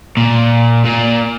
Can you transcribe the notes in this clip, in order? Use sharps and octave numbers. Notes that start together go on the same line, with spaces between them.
A#2
A#2